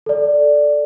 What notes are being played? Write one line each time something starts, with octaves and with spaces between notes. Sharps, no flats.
A4 D5